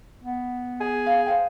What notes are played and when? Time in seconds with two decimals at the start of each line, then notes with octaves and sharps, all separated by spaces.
0.23 B3
0.81 G#4
1.06 F5
1.26 C5 F5 G5